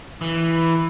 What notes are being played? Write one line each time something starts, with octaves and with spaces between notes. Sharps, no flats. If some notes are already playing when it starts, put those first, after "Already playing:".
E3